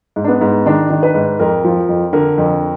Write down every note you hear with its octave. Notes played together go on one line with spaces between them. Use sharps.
G#2
D4
B3
G#2
D#3 D4
D#3
B4
G#2
F2 A#4
F3
F2
D3 A#4
F2